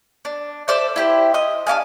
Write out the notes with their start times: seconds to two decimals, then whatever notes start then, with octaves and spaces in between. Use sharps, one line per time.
0.25 D4
0.68 A4 C5 D5 E5
0.96 E4 G4 C5
1.34 D#5 D#6
1.67 D4 G4 F5 G#5